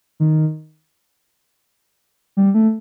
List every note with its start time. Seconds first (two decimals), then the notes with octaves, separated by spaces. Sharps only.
0.20 D#3
2.37 G3
2.54 A3